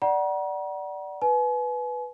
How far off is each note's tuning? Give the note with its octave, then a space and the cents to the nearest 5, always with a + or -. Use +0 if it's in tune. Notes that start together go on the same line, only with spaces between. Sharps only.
D5 +0 F#5 +25 A#5 +40
B4 +0 G#5 +40